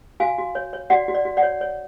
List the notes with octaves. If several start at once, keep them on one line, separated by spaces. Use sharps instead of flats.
F#4 F5 G#5
F#4
C#5
C#5
F#4 D5 F#5
F#4
D5
F#4
D5 F#5
C#5
C#5